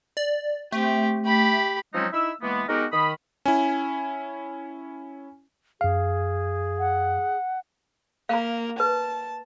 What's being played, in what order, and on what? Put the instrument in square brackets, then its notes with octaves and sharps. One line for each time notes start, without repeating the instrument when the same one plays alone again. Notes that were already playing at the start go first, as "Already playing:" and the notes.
[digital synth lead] D5
[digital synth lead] A3 [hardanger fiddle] C4 G4
[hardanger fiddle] G4 B5
[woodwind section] F3 F#3 G#3 C4 C#4 D#4
D#4 E4 E5 E6
E3 G#3 A#3 B3
G#3 B3 D#4 F#4 G4 A#4
D#3 B5 D#6
[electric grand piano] C#4 E4 [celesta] G#5
[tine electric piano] F#2 F5 [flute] G#4
[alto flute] F#5
[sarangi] A#3 [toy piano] F5 A#5
[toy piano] B4 [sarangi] A5